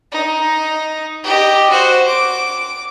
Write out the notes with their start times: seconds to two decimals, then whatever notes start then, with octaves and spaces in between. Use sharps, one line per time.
0.12 D#4
1.24 G4 D#5
1.70 F#4 C5
2.07 D6